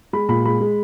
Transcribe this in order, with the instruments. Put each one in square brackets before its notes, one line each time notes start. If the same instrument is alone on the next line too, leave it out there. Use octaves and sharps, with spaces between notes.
[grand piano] G#3 B5
A#2 B5
G#3 B5
G#3